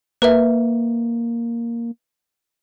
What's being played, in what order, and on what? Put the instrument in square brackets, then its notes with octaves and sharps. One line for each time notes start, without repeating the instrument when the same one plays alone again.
[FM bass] A#3 [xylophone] B4 E5